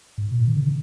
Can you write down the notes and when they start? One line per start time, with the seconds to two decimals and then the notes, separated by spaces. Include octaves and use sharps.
0.18 G#2
0.31 B2
0.37 A#2
0.48 D#3
0.56 C#3